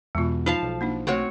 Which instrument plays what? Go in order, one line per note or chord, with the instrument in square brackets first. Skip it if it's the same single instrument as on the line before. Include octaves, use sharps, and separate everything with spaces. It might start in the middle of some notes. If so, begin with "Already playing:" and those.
[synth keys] E2 B2 [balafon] G#3 F4
[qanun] F3 F5 A5 [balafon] D#4
[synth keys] B1
[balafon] A#3 D4 D#4
[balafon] A3 C#6 [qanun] C4 F#4 C#5